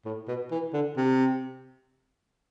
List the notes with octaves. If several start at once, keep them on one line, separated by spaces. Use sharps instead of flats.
A2
B2
E3
D3
C3